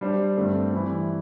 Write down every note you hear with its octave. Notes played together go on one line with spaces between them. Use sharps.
G3 D4 C5
G2 D3 A3 C4
E3 G3 E4